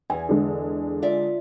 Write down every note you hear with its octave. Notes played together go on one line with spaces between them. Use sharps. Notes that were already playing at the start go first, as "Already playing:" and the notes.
E2 G#5
D3 G#3
F4 D5 E5